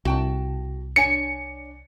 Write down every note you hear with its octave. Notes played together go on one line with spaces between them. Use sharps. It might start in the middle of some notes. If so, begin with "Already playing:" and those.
C2 F#4 G5 A5
D4 C#5 G#5 C#7